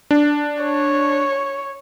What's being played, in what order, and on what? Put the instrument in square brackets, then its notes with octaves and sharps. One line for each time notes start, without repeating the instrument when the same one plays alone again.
[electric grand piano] D4
[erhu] C#5